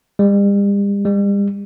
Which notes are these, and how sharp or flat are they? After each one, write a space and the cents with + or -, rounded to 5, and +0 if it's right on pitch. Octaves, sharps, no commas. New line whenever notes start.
G3 +40
G3 +40